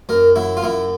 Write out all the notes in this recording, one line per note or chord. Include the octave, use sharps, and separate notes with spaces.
F#2 A#4
F#3 E4
F4
F#2 E4